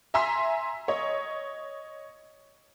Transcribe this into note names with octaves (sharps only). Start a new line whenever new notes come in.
E5 G#5 A#5 C6 E6 B6
C#5 D#5